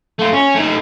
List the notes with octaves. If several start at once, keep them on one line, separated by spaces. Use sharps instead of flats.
A3 F4
C#4
A3 D#4